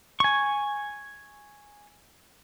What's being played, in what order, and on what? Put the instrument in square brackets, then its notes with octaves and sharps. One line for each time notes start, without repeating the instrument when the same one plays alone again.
[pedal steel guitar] G#5 C#6